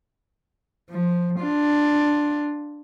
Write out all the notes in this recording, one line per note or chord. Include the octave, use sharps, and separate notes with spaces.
F3
D4 F4